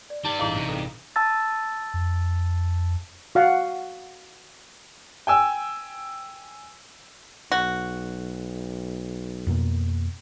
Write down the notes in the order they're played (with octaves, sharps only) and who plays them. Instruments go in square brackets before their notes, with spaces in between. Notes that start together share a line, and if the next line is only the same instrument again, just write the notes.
[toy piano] D5
[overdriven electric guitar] G3 D4 [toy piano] D#4 [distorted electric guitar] D5
[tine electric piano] A1 D#4 [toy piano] E4 G#4 F5
[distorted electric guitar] G2 [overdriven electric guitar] C3
[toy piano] E4 A4
[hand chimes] A5 E6 A6
[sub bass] F2
[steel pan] F#4 F5 F#5
[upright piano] G5 G#5 E6
[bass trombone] B1 [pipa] F#4
[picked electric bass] F2 B2 A#3